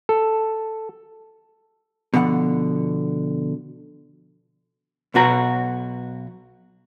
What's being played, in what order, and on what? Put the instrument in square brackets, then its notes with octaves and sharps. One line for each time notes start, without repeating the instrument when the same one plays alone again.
[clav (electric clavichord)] A4
[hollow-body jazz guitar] B2 D3 F3 F#5
B1 B2 F#4 A#5